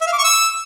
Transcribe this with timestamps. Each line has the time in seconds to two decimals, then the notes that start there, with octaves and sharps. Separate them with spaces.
0.01 E5
0.07 F5
0.12 D6
0.18 C#6
0.24 E6